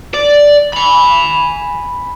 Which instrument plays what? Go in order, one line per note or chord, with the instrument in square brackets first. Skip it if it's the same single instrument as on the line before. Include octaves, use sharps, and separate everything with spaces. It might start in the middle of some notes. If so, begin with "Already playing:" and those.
[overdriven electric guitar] D5
G#5 B5